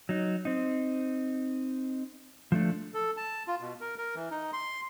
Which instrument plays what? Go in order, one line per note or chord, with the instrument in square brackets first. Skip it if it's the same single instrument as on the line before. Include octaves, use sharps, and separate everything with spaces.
[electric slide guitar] F#3 D#4
C4 D#4
F3 A3 D4
[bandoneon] A4
A5
F4
B2
A#4
A#4
E3
D#4
C6